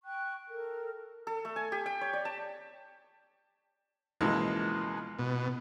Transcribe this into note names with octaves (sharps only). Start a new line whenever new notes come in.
G5 C#6 F#6
A4 A#4
A4
A3
G#5
G4
G5
C#5
D5
A5
C#2 B2 E3 F3 G#3 A#3
B2